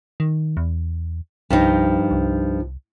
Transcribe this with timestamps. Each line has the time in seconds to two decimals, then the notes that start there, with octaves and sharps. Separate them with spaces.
0.20 D#3
0.57 E2
1.50 C2 G2 F3 D#4
2.11 C2